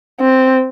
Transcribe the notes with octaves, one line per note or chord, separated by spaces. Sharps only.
C4